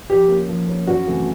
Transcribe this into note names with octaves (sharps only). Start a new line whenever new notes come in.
F3 G4
A#3 C#4
F3
A#3 C#4
F#2 F#4
C#3 E3 A3 C4